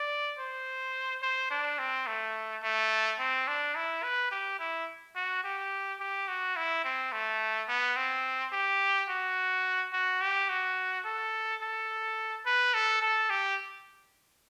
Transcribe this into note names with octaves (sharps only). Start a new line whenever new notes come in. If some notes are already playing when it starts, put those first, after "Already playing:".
Already playing: D5
C5
C5
D4
C4
A3
A3
C4
D4
E4
B4
G4
E4
F#4
G4
G4
F#4
E4
C4
A3
B3
C4
G4
F#4
F#4
G4
F#4
A4
A4
B4
A4
A4
G4